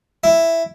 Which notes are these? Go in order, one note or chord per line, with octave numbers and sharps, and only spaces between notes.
E4